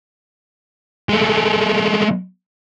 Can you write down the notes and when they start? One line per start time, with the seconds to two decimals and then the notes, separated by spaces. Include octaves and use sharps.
1.09 G#3 A3